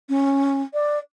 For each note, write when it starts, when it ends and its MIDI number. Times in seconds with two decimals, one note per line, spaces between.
0.09 0.62 61
0.73 0.99 74